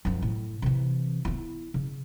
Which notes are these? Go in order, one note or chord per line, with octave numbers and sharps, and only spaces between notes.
F#2 F3
A2
C3 E3
B3 E4
C#3